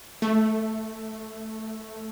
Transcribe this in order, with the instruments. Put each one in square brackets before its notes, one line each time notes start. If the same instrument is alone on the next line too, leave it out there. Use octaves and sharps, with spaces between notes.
[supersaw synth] A3